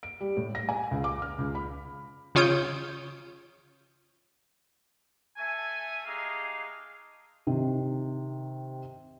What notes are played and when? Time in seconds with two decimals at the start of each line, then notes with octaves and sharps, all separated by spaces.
0.03 D7
0.20 G3
0.37 A2
0.55 A#6
0.69 G#5
0.91 C#2
1.04 D6
1.22 F6
1.38 C#2
1.55 B5
2.35 C#3 F4 C#5 D#6 G6 D7
5.37 A3 A4 E5 G#5
6.06 G#3 A3 D#4 G4 G#4 F5
7.47 C3 D#3